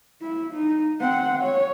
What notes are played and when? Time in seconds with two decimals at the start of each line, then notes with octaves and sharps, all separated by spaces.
0.21 E4
0.54 D#4
1.00 C4 F#5
1.42 C#5